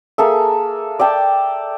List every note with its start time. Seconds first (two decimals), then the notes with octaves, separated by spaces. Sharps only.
0.18 A#3 G#4 A4 E5
0.99 D5 E5 G5 A5